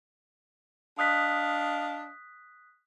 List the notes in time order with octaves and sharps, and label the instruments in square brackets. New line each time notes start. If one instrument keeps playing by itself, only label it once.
[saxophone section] D4 D#5 F5 [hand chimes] D#6 F#6 B6